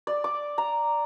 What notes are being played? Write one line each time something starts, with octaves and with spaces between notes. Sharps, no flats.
D5
D6
A#5